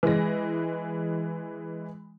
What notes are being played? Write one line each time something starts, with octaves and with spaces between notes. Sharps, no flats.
E3 G#3 A#6